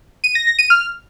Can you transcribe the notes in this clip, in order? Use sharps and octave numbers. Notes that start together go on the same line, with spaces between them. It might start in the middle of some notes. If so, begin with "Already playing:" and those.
D#7
A#6
A#6
D#7
F6